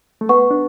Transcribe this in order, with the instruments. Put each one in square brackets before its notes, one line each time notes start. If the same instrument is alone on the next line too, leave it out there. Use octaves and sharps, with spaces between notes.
[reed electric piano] A3
[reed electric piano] B3 [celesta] B4 F#5 C#6
[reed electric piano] D4